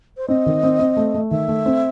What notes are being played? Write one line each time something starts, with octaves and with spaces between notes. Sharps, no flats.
C5
C4 D#5
D#3
C4
C4
A3
A3
D#3 E5
A3
C4